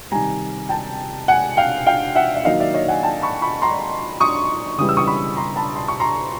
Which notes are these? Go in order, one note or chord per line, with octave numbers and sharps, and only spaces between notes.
C3 D#3 G3 G#5 A#5
G5 A5
F#5 G#5
F5 G5
F5 G5
E5 F#5
E5
D#3 F#3 A#3 D#4 D#5 F5
D5 E5
C#5 D#5
F#5 G#5
G5 A5
B5 C#6
B5 C#6
A#5 C6
C#6 D#6
C#3 E3 G3 D#6
E6
C#6 D#6
B5 C#6
A#5 C6
A5 B5
C6
C#6
A#5 C6